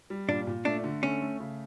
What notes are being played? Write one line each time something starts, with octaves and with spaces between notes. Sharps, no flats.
G3
A#2 D4
A#2
A3 D4
D3
A3 C#4
A3
C#3